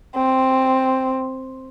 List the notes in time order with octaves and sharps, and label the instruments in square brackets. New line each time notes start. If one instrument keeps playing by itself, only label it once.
[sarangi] C4